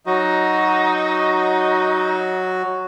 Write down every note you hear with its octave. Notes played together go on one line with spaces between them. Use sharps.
F#3 D#4 F#4